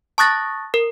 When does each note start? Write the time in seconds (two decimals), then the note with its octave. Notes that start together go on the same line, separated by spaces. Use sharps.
0.18 A5 C#6 D#6 F#6 A6 A#6
0.74 A#4